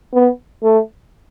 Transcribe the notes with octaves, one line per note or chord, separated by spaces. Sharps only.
B3
A3